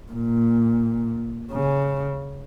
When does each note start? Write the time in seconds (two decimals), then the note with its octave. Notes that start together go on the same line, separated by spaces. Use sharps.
0.12 A#2
1.52 C#3